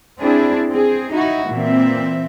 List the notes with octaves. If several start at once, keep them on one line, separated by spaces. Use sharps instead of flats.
C4 D4 E4 G#4
C4 G#4
D#4 E4 F#4
A#2 E3 C4 E5